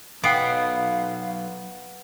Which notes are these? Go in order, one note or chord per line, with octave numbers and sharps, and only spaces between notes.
B1 B3 F5 G5 C7 D7